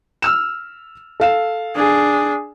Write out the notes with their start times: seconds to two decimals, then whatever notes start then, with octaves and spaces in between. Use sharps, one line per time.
0.22 E6 F6 E7
1.20 A4 F5 E7
1.75 D4 G#4